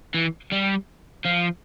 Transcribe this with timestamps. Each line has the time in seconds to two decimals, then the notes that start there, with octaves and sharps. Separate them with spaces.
0.14 E3
0.52 G3
1.25 F3